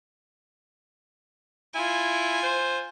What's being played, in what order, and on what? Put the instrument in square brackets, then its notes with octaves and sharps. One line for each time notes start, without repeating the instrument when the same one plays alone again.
[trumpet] E4 [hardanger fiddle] F4 G#5
[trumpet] C5